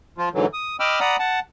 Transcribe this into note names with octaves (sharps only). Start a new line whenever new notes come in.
F3 F4
G#2 D3 E3 F#3
D#6
D#5 G5 B5 D6 E6 F6
D5 F#5 A#5 B5 D#6
F#5 A5